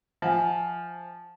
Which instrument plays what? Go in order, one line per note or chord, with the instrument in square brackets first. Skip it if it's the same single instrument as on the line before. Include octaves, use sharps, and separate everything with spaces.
[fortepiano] F3 [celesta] E5 F#5 G#5